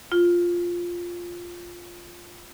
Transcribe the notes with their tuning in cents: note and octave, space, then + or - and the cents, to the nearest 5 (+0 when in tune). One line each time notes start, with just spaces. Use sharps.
F4 +0